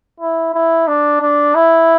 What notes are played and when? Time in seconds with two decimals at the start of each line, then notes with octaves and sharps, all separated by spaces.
0.20 E4
0.54 E4
0.88 D4
1.21 D4
1.55 E4